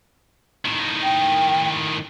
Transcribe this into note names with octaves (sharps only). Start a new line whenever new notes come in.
A2 D#3
G5